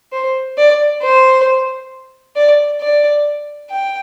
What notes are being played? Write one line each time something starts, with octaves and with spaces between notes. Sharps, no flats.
C5
D5
C5
D5
D5
G5